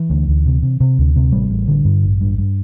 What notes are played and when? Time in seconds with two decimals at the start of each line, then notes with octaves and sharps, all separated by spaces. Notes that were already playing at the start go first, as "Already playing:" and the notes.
Already playing: E3
0.10 D2
0.28 D2
0.46 C3
0.62 C3
0.80 C3
0.98 D2
1.16 C3
1.32 A1 G3
1.50 A1
1.68 D3
1.85 G2
2.03 A1
2.21 G2
2.38 G2